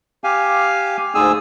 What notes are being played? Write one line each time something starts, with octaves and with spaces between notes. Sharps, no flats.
G4 F5 G#5
D2 G#2 G#4 G#5 E6